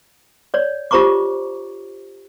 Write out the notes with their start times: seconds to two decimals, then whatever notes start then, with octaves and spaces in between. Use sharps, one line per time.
0.54 C#5 D5
0.91 F4 G4 C5 A#5 C#6 D6